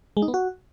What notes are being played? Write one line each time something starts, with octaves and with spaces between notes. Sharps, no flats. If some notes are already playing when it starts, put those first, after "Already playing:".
G#3
D#4
B3
F#4